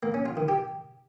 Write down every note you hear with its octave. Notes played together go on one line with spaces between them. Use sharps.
A#3
C#4
F4
D#3
G4